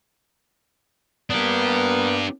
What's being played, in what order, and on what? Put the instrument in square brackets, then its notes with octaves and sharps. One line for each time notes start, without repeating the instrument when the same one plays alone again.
[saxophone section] A#3 B3 [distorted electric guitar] D4 G4